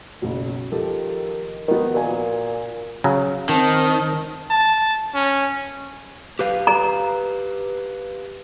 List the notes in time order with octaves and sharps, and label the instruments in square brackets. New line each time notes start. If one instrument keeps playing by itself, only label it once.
[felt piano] F#1 B1
[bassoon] D#3 [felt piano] F3 G4 A4
[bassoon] D#3 [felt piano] F3 B3
[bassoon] A#2 [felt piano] F#4 G#5
[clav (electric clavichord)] C#3 F#3
[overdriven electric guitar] D#3 [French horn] C4 [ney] A5
[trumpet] A5
C#4
[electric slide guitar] G4 B4 F5
[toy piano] A#5